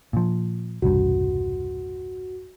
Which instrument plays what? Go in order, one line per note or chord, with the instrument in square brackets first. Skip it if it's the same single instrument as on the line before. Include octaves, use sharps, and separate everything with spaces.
[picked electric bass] A#2 F3
[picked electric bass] E1 C2 G2 [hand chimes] F#4